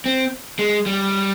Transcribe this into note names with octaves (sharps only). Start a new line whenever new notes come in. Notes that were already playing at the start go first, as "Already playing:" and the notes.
C4
G#3
G3